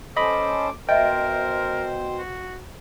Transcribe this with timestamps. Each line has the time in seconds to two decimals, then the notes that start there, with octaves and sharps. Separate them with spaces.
0.17 C#4 A4 C5 D#5 B5 D6 D#6
0.89 B2 A#4 C5 D#5 E5 G5
2.18 F#4